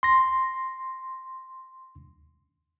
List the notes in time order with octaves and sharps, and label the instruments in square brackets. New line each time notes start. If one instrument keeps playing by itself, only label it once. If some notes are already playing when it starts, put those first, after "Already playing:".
[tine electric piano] C6 A#6